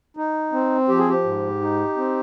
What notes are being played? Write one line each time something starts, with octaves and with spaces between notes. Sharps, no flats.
D#4
C4
F3 G4
G#4
G4
G#2
D#4
C4